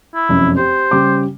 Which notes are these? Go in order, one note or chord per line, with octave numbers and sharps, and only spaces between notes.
E4
F1 F#2
G4 C5
C#3 G3 D6